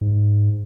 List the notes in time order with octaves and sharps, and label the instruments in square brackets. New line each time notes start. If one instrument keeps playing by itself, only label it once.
[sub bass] G#2